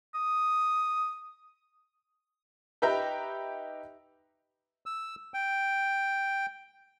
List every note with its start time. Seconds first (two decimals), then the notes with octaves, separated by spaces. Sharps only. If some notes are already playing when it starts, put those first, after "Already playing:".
0.14 D#6
2.82 D#4 G4 B4 E5 G5 A#5
4.86 E6
5.34 G5